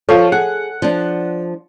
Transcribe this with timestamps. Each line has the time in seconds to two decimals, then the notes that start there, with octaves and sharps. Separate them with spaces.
0.09 F3 F4 A4 C#5
0.32 G#4 F#5
0.82 F3 D4